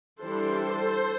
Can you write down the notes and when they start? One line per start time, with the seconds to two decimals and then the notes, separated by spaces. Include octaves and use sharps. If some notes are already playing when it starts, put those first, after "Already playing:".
0.20 E3 G3 D4 A4 C5